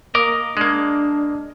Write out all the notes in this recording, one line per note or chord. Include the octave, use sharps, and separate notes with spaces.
A#3 A#4 D#5 D6 D#6
G#3 A#3 D4